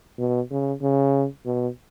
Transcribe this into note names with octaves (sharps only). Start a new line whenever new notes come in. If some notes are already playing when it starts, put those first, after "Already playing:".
B2
C#3
C#3
B2